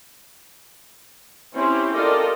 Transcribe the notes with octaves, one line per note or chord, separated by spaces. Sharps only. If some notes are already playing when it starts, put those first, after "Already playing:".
C4 C#4 E4 G4 C5
F4 G4 A4 A#4 D5 D#5